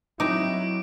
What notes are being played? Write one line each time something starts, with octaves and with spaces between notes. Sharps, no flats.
F#3 C4 D#4 E4 D6 D7